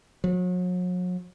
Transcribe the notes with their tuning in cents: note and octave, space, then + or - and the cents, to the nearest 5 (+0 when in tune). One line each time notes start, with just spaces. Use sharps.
F#3 -40